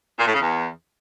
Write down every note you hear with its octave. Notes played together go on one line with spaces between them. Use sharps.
A#2
A2
C#3
E2